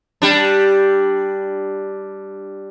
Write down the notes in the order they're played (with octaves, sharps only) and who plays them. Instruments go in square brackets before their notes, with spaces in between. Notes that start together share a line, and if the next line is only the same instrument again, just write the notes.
[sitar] G3 D4